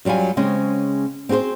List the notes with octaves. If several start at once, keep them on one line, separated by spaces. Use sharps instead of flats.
F#2 F#3 G3 F4 G#5
C#3 G#3 C4 C#4 C5
C4 F#4 G#4 B4 C5